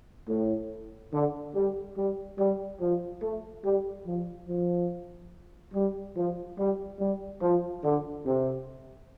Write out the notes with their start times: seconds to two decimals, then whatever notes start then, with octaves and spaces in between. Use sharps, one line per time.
0.28 A2
1.13 D3
1.54 G3
1.97 G3
2.38 G3
2.81 F3
3.22 A3
3.64 G3
4.06 F3
4.48 F3
5.74 G3
6.16 F3
6.58 G3
6.99 G3
7.41 F3
7.84 D3
8.26 C3